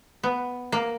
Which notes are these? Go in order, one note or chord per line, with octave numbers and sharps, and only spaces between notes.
B3
A#3